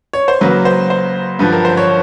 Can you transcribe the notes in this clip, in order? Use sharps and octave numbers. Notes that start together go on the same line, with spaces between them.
C#5
C5
C#3 F#3 A#3 B4
C5
C5
G2 D3 F3 B4
A#4
C5
C#5